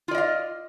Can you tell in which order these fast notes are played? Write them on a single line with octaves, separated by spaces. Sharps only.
F4 D5 D#5 F5